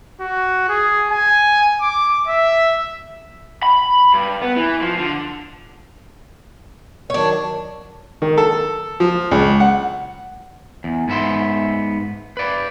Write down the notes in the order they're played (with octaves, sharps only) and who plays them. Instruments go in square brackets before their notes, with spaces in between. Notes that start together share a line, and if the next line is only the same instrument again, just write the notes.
[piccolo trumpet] F#4
G#4
G#5
D6
E5
[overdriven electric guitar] B5
G2
B3
E3
F3
D3
[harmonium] D#3 F#3 [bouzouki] D4 C#5
[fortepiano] D#3
A4
F3
C#2
F#5
[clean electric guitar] E2
G#2 B3 E5 C6
B4 D5